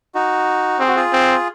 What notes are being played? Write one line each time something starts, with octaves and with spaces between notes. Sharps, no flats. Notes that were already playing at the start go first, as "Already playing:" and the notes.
D#4 F#4
C4 G#4
F#4
F4 G#4
C4